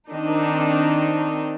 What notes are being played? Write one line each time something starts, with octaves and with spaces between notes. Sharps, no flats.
D#3 C4 D4 D#4